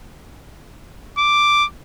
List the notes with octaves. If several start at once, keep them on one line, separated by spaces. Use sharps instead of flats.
D6